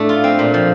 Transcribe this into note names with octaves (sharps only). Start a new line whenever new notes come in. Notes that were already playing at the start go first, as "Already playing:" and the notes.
Already playing: A2 A3 D4
F4
C4
A#2
F3